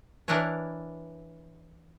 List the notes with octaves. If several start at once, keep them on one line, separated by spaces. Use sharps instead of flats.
E3 D4 E4 A#4 B4 C#5